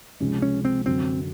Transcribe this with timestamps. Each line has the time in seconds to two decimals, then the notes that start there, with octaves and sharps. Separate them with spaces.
0.20 C#2 C3 F3 G#3 C#4
0.42 C#4
0.65 C4
0.86 F#2 D3 F#3 C4